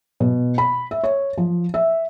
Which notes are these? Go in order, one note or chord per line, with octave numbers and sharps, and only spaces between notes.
B2
B5
E5
C#5
F3
E5